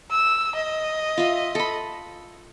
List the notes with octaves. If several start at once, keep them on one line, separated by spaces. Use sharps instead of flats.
E6
D#5
F4 E5
A4 B5